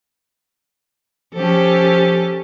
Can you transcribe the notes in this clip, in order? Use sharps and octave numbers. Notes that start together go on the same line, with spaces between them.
F3 C#4 G4 A4